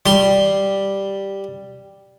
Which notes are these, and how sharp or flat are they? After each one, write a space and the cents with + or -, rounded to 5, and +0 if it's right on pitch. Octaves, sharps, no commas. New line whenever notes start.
G3 +0 C6 +0